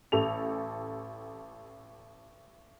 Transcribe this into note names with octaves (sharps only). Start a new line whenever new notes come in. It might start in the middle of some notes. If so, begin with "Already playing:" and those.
A1 G4 A4 F7